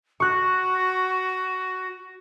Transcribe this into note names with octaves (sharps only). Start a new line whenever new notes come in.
F#4 C#6 F#6